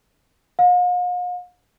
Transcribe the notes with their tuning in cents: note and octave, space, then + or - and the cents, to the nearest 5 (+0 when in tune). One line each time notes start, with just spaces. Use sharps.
F5 +45